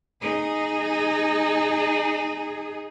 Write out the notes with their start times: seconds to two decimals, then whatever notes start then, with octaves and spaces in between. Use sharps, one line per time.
0.21 D#4 G#4